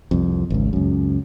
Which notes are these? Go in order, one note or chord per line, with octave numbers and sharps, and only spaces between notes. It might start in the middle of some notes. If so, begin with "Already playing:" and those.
C2 F2
G#1 C#2
C#2 F#2